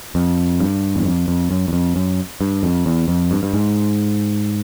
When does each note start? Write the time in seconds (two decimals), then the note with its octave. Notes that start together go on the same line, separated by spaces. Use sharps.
0.15 F2
0.60 G2
0.96 E2
1.05 F2
1.28 F2
1.51 F#2
1.68 E2
1.73 F2
1.96 F#2
2.41 G2
2.63 F2
2.86 E2
3.08 F2
3.31 G2
3.43 G2
3.53 G#2